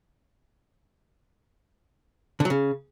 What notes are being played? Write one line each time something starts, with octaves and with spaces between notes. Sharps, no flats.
D3
F#3
C#3